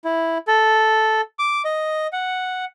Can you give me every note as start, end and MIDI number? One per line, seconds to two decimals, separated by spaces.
0.05 0.38 64
0.48 1.21 69
1.39 1.62 86
1.65 2.07 75
2.13 2.65 78